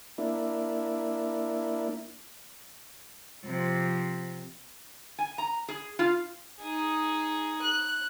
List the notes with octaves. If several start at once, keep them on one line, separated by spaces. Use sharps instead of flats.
A#3 D4 E4
C3 F3
G#5
A#5
G#4
F4
D#4 G#4
F#6